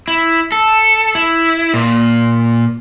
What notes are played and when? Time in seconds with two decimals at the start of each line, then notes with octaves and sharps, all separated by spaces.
0.08 E4
0.52 A4
1.15 E4
1.74 A#2